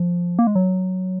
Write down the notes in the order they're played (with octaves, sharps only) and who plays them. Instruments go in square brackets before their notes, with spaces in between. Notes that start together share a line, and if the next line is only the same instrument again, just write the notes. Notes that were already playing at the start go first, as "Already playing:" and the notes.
Already playing: [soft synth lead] F3
A#3
G#3
F#3